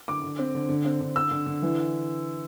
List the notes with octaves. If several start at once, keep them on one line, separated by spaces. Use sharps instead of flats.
D3 D6
D3
C4
D3
D3
C4
D3
D3 E6
D3
D3
E3